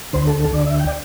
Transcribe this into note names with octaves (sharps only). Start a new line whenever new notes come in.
D2 D3 C5
A4
A4
D2 D3 D5
E5
G5
D5